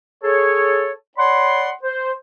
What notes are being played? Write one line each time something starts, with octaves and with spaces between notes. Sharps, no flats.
G#4 A4 C#5
C#5 D5 F#5 B5 C6
C5